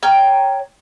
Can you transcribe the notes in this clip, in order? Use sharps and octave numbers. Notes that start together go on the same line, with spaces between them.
C#5 G5 A#5 F6